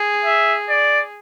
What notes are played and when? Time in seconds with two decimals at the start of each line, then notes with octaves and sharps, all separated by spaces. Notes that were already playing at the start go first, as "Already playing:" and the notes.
Already playing: G#4
0.24 E5
0.69 D5